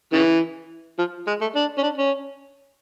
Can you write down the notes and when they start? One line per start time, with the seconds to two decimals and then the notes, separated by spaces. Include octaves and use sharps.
0.13 C#3 E3
0.98 F3
1.27 G#3
1.41 A3
1.55 D4
1.78 C#4
1.83 D4
1.98 C#4